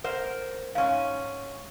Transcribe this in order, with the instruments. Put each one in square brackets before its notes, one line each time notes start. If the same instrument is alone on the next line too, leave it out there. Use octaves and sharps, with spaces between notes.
[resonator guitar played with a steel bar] A#4 C5 [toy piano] F#5
[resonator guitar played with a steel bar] G#2 C#4 [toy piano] F5